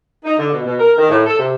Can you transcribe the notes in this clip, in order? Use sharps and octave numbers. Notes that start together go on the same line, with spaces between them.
D#4
D3
B2
B2
A#4
D#3
A2
A4
C3